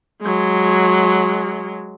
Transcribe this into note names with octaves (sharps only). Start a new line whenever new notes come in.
F#3 G#3